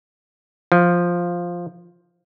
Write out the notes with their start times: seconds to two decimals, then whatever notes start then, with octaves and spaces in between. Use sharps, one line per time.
0.72 F3